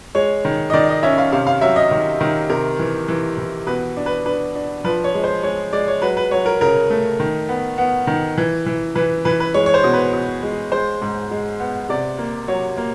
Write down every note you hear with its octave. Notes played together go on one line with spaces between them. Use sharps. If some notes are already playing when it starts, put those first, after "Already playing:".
G#3 C#5
D#3
D#5
D#3 D5
D#5
C#4 E5
F5
C3 F5
F5
F#3 E5
D#5
D#3
D#3
C3 A#4
E3
E3
E3
B2 B4
D4
B4
D4 B4
D4
F3 B4
C#5
G#3
C5
G#3 C#5
G#3 D5
C#5
F#3 B4
B4
F#3 C#5
A#4
C#3 A#4
A3
D#3
B3
B3
D#3
E3
E3
E3 B4
E3 B4
B4
G#3 C#5
C#5
C5
B2
B4
B2
G#3
G#3 C5
G#2
G#3
B3
C3 D5
A#3
F#3 C#5
A#3